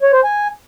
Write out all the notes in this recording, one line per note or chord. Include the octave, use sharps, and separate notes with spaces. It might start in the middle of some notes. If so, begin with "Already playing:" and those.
C#5
C5
G#5